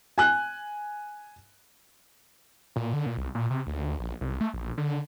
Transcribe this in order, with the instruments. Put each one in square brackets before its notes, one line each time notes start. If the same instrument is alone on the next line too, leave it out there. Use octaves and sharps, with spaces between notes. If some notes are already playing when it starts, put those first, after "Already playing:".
[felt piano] G#5 F#6
[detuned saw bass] A#2
D3
A#2
C2
A#2
C3
D2
A#1
C2
A3
A#1
D3